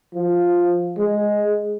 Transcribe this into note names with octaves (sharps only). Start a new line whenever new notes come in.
F3
G#3